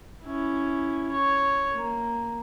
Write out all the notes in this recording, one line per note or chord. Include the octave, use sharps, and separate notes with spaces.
C#4 E4
C#5
A#3